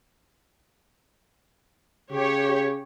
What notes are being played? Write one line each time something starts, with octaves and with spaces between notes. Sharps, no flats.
C#3 G4 C#5